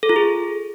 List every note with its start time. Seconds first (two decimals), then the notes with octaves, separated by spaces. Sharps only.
0.03 A4
0.09 F4
0.16 G#4